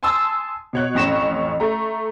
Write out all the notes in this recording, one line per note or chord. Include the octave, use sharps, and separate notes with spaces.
G#5 A5 C6 D#6 E6
B2 C#5 F#6
A1 F2 C#4 A#6 E7
A3 A#5